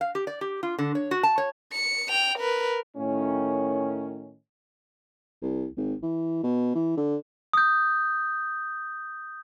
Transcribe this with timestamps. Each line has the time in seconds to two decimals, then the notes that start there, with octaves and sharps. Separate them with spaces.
0.01 F5
0.15 G4
0.27 D5
0.41 G4
0.63 F4
0.79 D3
0.95 C#5
1.11 F#4
1.23 A5
1.38 C#5
1.72 C#7
2.09 G5 F7
2.39 A#4 B4
2.97 A2 D#3 C#4
5.42 C2
5.77 G#1
6.02 E3
6.44 B2
6.75 E3
6.97 D3
7.53 D#6 G6